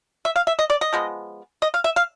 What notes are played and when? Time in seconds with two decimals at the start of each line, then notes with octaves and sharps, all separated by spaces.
0.25 E5
0.36 F5
0.47 E5
0.59 D#5
0.70 D5
0.81 D#5
0.93 F3 G#3 B3
1.62 D#5
1.74 F5
1.84 E5
1.96 F5